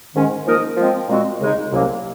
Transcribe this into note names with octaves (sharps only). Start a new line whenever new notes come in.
G#2 D#3 G#3 C#4
F3 A#3 D#4 A#4 D#5
F3 G#3 C4
A#2 G#3 C4 F#4
D#2 C#3 G#3 D#4
C2 C3 F#3 A#3 C#4